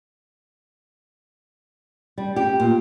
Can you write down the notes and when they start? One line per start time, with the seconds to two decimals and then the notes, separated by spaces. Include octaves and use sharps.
2.18 G3
2.36 G4
2.60 A#2